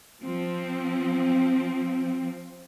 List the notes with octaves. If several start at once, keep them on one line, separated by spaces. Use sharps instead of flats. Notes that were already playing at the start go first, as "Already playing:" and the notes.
F3 C4